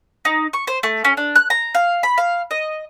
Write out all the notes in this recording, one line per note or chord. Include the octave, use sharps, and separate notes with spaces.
D#4
C#6
C5
A3
C#4
D4
F#6
A#5
F5
B5
F5
D#5